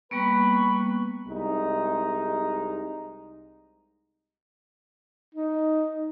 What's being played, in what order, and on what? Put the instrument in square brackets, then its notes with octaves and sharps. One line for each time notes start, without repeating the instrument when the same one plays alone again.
[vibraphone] G3 A#3 B3 [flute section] B4 B5 C#6
[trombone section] C2 G#3 D#4
[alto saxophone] D#4